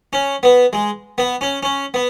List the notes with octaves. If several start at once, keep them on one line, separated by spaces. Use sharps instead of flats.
C#4
B3
G#3
B3
C#4
C#4
B3